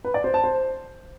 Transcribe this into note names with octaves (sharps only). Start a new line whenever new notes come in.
B4
D5
C5
A5
C5